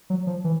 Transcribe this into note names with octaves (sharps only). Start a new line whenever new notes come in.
F#3
F3
E3